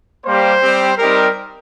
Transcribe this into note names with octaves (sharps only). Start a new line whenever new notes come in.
G3 A#3 G4 C5
G3 C4 G4
G3 C4 D#4 G4 A#4